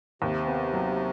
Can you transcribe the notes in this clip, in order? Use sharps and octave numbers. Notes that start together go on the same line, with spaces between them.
D#2 C3
B3
F#3